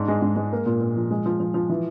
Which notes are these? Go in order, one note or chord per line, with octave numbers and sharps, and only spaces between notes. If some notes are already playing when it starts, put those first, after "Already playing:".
Already playing: G#2 D4
G#3
G#2
G#3
A#3
A#2
A#2
F3
G#3
F3
F3
F3
E3